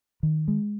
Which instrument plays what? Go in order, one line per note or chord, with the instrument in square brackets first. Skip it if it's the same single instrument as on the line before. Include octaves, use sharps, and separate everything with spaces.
[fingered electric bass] D#3
G#3